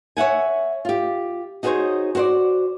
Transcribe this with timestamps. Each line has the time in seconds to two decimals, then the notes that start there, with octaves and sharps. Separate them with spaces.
0.17 C#5 E5 F#5 G#5
0.85 F4 G4
1.63 D#4 F#4 G#4 A#4 C5 C#5
2.15 F#4 C5 D5